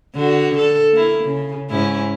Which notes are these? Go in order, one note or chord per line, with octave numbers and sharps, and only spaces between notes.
D3 F#4
A4
A#3 E4
C#3
G#2 C#4 E4